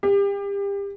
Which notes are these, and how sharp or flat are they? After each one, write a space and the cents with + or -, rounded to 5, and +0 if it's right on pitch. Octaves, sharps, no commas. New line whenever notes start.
G4 +30